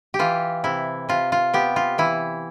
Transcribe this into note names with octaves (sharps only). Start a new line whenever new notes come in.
G4
E3 F4
C3 E4
C3 F4
F4
B3 G4
F4
E3 E4